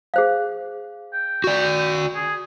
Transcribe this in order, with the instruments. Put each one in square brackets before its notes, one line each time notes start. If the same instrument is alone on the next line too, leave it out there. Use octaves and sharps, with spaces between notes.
[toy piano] G#4 C5 F5
[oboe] G5
[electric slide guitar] F#4 D5
[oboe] G#4